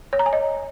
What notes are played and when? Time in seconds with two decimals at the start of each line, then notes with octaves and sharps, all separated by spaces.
0.13 C#5
0.19 A#5
0.26 G#5
0.33 D#5